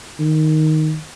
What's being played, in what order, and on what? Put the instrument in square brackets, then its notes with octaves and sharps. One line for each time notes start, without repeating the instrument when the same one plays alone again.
[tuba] D#3